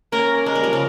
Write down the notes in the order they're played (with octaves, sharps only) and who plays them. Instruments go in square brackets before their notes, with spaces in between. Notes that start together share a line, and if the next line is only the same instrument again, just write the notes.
[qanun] A#3 C#4 [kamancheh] A#4
[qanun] G#3 [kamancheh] A#4
[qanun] G3
F3
C#3